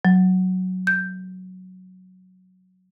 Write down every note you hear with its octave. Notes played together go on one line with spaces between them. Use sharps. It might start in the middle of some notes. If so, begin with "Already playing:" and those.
F#3
G6